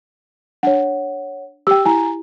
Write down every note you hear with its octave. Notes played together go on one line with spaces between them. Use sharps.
D4 C#5 F#5
G4 G5 E6
E4 G#5 A#5